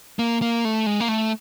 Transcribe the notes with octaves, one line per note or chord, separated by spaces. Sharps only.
A#3
A#3
A3
G#3
A#3
A3